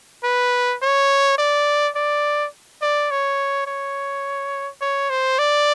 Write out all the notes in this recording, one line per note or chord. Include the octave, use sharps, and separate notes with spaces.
B4
C#5
D5
D5
D5
C#5
C#5
C#5
C5
D5